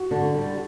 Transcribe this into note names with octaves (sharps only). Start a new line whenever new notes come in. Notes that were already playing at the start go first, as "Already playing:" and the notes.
Already playing: F#4
D3
G3